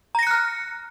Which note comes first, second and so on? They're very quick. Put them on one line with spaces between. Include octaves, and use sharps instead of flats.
A#5 A#6 C#7 F#6 F6